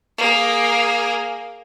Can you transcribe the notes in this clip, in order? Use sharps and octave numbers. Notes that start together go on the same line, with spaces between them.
A#3 G#4